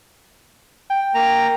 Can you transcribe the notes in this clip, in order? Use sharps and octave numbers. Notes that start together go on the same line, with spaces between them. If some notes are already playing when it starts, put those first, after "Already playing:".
G5
A#3 A#5